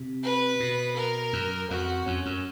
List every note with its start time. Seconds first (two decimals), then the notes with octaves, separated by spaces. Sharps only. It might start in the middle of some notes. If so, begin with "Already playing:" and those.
Already playing: C3
0.24 B4
0.60 B2
0.96 A#4
1.33 F#2
1.71 F2 F#4
2.06 F2 C#4
2.26 F#2